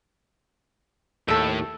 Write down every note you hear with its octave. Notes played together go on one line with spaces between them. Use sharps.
D#2 A2 A4 E5